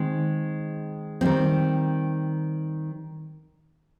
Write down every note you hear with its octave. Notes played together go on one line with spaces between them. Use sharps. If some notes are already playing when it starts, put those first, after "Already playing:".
Already playing: D#3 G#3 C4 D#4
D#3 G3 C4